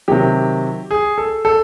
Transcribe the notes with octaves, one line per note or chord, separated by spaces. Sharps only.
C3 D#3 F#3 G4
G#4
A4
A4